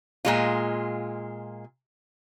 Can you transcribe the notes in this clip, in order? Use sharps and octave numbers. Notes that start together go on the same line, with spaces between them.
A#2 G#3 F4